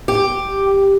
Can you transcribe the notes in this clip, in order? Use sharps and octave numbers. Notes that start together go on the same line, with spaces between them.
G4